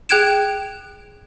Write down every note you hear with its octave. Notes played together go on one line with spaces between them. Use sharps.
G#4 G5 F#6 G#6 D7 E7